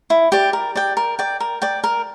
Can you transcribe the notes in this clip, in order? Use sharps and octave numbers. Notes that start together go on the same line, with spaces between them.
E4
G4 D5
A#4
D5 G5
A#4
D5 G5
A#4
D5 G5
A#4